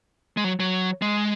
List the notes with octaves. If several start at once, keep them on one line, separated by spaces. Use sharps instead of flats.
G#3
F#3
F#3
G#3